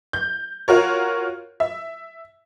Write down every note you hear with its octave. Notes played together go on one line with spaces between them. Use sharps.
G6
F4 F#4 A#4 C#5
E5